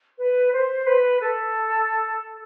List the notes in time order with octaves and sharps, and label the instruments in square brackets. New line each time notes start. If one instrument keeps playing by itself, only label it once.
[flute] B4
C5
B4
A4